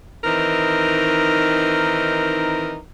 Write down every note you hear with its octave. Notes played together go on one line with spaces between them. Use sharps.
D#3 E3 C4 D#4 A#4